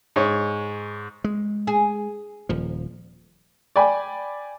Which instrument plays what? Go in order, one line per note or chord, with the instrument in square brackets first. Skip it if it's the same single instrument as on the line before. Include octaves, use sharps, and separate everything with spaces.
[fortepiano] G#2 C#5
[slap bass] G#3
[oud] G#4
[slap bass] D#1 F3
[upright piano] D5 G5 G#5 B5